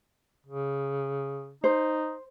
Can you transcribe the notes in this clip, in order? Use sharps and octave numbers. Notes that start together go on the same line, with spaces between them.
C#3
D#4 C5